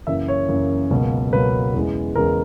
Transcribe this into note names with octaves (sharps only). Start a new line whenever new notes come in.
F#2 C#3 E3 A#3 E5
C#5
F#2 C#3 E3 A#3
C#2 B2 F#3 A#3
C#2 B2 F#3 A#3 B4
E2 C#3 E3 G#3
E2 C#3 E3 G#3 A#4